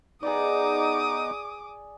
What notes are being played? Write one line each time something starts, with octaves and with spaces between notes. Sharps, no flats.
B3 D#4 G#4 D5 D6 D#6